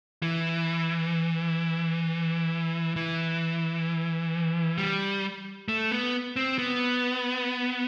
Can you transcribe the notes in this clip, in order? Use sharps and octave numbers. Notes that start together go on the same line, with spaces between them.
E3
E3
G3
A3
B3
C4
B3